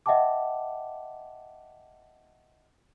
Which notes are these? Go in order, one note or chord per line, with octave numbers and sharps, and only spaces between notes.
D#5 E5 F#5 G5 A5 D6